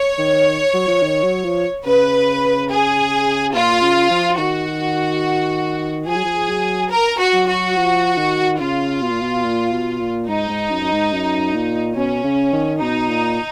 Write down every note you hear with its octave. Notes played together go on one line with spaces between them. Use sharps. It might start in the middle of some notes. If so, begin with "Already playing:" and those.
Already playing: C#5
D#3
F#3
F3
D#3
F#3
F3
C#3 B4
G#4
A#2 F4
C#3
F3
D#3 F#4
F3 G#4
F#3
F3
F#3
A#4
F#4
F#3
F#4
F3
D#3
C#3 F4
B2
A#2
B2
A#2
B2
A#2
G#2 D#4
G#2
F#2
F#2
G#2
F#2
A#2
B2 C#4
C#3
D#3
B2 D#4
A#2